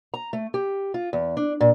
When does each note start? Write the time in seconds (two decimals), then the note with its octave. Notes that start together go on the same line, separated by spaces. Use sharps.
0.14 A#5
0.33 A3
0.54 G4
0.94 F4
1.13 E2
1.37 D4
1.61 A#2